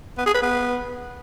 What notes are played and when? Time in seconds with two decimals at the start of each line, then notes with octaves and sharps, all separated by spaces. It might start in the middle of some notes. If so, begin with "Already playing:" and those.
0.18 B3
0.26 G#4
0.34 B4
0.43 B3